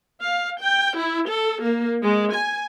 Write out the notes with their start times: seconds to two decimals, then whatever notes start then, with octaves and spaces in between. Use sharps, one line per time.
0.20 F5
0.61 G5
0.98 E4
1.28 A4
1.62 A#3
2.03 G#3
2.34 G#5